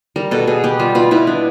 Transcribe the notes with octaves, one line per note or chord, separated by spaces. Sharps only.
G3 A#4
B2 A4
B2 G#4
B3 G4
G3 F4
B2 F4
B2 E4
B3 D4